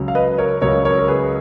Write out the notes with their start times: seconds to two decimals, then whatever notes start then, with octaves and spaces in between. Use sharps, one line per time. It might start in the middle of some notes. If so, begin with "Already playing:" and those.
Already playing: C#2 C#3 F#3
0.08 F5
0.15 B4 D#5
0.38 A#4 C#5
0.61 C#2 C#3 F#3 A#4 C#5
0.85 A#4 C#5
0.98 A#4
1.08 G#4 B4